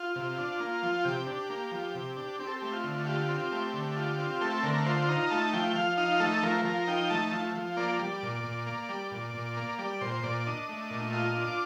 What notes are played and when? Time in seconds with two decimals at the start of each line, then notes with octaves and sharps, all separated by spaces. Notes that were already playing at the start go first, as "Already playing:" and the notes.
Already playing: F4
0.16 C3
0.38 D4
0.60 A#3
0.83 F3
1.05 C3 G4
1.27 D4
1.50 A#3
1.72 F3
1.95 C3
2.16 D4
2.40 C4 G4
2.47 A4
2.56 G4
2.62 A3
2.72 F4
2.84 D3
3.06 F4 G4
3.28 C4
3.52 A3
3.74 D3
3.96 F4
4.18 C4
4.41 A3 A4
4.63 D3 A#4
4.86 F4 C5
5.09 D#4 A#5
5.30 A3 A5
5.53 F3 G5
5.76 F3 F5
5.97 D#4 F5
6.20 A3 A4
6.43 F3 A#4
6.65 F3 A#4
6.88 D#4 G5
7.10 A3 A5
7.32 F3
7.55 F3
7.77 A#3 D5
7.99 G3
8.23 A#2
8.44 A#2
8.66 A#3
8.89 G3
9.11 A#2
9.35 A#2
9.57 A#3
9.79 G3 D5
10.01 A#2 C5
10.24 A#2 D5
10.47 D4 D#5
10.69 A3
10.90 A#2
11.13 F4 D#5
11.36 D4
11.47 D6